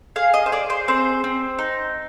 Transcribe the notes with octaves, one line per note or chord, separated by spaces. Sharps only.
G#4 F5
D#5
C5
G#4 D5
C5
C4 C5
C4
D#4